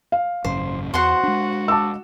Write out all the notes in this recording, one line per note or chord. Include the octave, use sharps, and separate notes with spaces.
F5
G#1 F#2 C#3 C5
E2 F#4 C5 F#5 C6
G#3 D4
A5 D6 E6